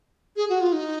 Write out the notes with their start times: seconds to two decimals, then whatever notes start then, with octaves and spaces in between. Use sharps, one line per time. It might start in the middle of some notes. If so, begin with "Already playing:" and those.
0.36 G#4
0.49 F#4
0.61 F4
0.73 D#4